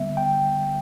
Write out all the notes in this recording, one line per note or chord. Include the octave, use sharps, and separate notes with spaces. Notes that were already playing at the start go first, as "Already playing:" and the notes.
Already playing: D3 G3 B3 E5
G5